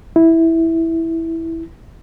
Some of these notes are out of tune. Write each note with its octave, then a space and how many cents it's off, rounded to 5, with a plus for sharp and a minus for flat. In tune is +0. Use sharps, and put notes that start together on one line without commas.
E4 -5